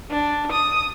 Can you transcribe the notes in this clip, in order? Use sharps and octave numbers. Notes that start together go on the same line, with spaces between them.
D4
D#6